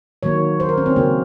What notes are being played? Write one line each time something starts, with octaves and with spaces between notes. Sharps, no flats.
D#3 F#3 A#3 C#5
C5
A#4
C#4
C4
C#3 F#3 A#3